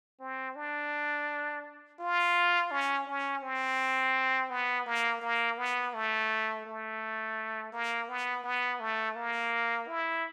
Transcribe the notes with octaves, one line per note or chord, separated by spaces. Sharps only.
C4
D4
F4
C#4
C#4
C4
B3
A#3
A#3
B3
A3
A3
A#3
B3
B3
A3
A#3
E4